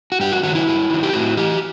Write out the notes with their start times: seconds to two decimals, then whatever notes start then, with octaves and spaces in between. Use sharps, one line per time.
0.12 F#4
0.20 G2 G4
0.32 F#4
0.43 D#3 F#3 F#4
0.55 E4
0.68 G2
0.90 D#3 F#3
1.03 G4
1.13 A2 F#4
1.37 E3 G4